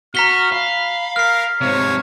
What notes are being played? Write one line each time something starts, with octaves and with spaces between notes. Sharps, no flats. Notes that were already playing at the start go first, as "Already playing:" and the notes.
F#4 A#5 F6 B6 G7
F5 B5
A#4 F6 C7
G#2 C3 C#5